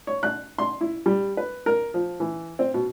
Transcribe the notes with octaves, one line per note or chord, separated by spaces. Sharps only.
C#5
F#6
C6
E4
G3
B4
A#4
F3
E3
C4
B2